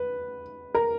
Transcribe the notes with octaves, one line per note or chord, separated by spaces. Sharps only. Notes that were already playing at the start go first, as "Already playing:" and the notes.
Already playing: B4
A#4